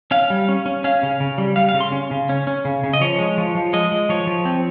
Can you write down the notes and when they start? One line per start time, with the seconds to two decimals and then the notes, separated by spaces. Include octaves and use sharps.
0.11 C#4 F5
0.30 G3
0.49 C#4
0.66 C#4
0.84 C#4 F5
1.03 C#3
1.20 C#3
1.38 G3
1.56 G3 F5
1.69 F5
1.74 C#3
1.80 C6
1.92 C#4
2.11 C#3
2.29 C#4
2.47 C#4
2.65 C#3
2.84 C#3
2.93 D#5
3.01 F3 C#5
3.19 G#3
3.37 F3
3.55 F3
3.73 G#3 D#5
3.92 G#3
4.09 F3 C#5
4.27 F3
4.45 C4